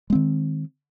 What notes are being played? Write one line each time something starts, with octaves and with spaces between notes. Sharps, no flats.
D#3 G#3 C4